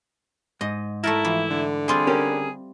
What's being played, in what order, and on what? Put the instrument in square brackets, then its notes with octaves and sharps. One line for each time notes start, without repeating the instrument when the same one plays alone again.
[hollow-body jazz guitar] G#2 [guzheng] D#5
[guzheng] A3 A4 A#4 [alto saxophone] E4
[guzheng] E3 [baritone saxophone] F3
[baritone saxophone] D3
[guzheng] G3 C4 F4 [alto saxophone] G#4
[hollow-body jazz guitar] C#4 G4 A#4